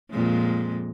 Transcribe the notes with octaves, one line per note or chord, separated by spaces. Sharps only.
F2 A#2 G#3